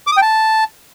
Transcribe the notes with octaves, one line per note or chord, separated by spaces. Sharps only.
D6
D#6
G5
A5